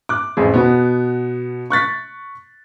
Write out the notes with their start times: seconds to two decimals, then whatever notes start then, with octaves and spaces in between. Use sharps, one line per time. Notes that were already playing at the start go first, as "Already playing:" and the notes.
0.09 D6 F#6
0.37 A1 F2 G#4
0.54 B2 B3
1.70 C#6 F#6 A6 B6